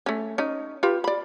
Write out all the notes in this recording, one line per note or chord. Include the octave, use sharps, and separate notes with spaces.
A3 C#4
C#4 D#4
F4 G4 B4
D5 B5